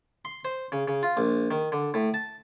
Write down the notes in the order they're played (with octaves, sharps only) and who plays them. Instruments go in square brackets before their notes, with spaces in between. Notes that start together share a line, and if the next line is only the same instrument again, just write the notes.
[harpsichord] C6
C5
C#3
C#3
F4
A#1
D#3
D3
A2
A5